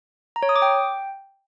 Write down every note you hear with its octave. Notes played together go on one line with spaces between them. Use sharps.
A#5
C#5
D#6
D6
G5